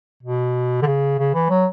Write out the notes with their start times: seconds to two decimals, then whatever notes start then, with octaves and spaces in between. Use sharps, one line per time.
0.23 B2
0.82 D3
0.86 C#3
1.19 C#3
1.34 E3
1.50 F#3